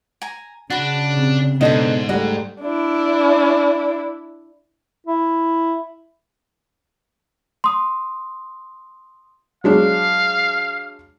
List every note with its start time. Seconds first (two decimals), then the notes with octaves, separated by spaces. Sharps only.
0.22 G#5 A#5
0.70 C#3 D4 F#4 B5
1.16 C3
1.61 G#2 B2 D4 A4 B4 C5 D#5
2.09 G3 A3 F#4 G#5 A#5
2.62 D4 E4
5.06 E4
7.64 C6 D#6
9.64 F#3 G#3 D4 F5